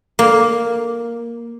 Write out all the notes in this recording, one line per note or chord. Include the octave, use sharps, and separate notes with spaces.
A#3